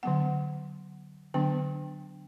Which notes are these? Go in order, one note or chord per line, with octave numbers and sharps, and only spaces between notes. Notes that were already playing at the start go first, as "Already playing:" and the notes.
D3 F#3 B3 F#5
D3 F#3 B3 D4 G5